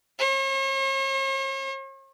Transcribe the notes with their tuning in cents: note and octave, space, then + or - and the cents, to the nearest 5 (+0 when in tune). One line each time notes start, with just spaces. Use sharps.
C#5 -45